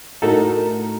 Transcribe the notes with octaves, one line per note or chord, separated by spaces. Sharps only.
A2 A3 D#4 F#4 A4 A#4